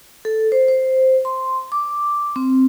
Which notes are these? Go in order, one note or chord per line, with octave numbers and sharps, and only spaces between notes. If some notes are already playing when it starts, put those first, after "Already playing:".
A4
C5
C5
C6
D6
C4